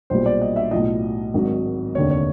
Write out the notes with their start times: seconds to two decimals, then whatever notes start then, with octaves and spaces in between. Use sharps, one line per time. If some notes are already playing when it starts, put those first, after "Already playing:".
0.10 B1 A#2 G3 C5
0.26 D5
0.42 D#5
0.56 E5
0.71 B1 A2 F3 D#5
1.34 G#1 G#2 D#3 F#3
1.95 F1 D#2 D3 C#5
2.11 C#5